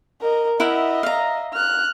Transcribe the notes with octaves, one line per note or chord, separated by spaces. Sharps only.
A#4 D#5
E4 A#4 D#5 E5 F#5
F5 A#5
F6 F#6